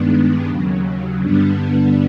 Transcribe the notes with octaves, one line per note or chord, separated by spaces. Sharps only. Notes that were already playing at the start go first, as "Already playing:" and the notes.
Already playing: G2 D#3 G#3 B3 D4
D#2 C#3 F#3
G2 D3 G3 B3 D4